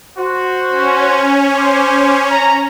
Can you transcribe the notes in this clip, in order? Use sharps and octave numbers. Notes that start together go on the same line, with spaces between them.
F#4 C5
C#4
C5 D6
A#5